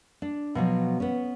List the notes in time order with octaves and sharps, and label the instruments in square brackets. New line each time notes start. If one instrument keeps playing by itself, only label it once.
[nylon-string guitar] D4
B2 F3 F#3
B3 C#4